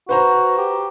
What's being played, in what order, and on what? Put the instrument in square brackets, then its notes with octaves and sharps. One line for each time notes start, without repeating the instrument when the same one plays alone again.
[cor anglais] F#4 [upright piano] B4 C5 A#5
[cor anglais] G4